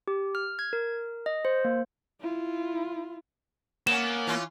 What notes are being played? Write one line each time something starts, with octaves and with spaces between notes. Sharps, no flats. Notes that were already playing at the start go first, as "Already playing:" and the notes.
G4
F6
G#6
A#4
D#5
C5
A#3
E4 F4
A#3 B3 C#4 E7
E3 C#4 F4